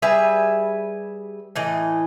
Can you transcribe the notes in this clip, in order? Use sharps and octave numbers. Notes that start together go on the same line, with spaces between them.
G3 G#4 B4 E5
A2 E3 D#5